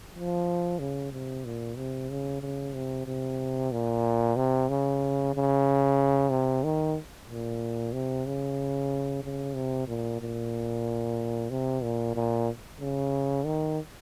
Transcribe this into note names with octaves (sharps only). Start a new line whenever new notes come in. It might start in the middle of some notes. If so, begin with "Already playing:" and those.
F3
C#3
C3
A#2
C3
C#3
C#3
C3
C3
A#2
C3
C#3
C#3
C3
D#3
A#2
C3
C#3
C#3
C3
A#2
A#2
C3
A#2
A#2
C#3
D#3